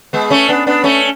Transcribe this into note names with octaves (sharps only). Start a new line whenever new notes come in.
G#3 B3
A3 C#4
B3 D4
B3 D4
A3 C#4